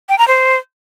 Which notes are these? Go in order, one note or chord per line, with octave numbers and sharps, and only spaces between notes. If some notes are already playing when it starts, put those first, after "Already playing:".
G5
A#5
C5